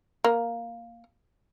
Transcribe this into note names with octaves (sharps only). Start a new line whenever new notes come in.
A#3